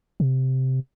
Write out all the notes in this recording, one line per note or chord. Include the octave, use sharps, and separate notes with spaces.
C3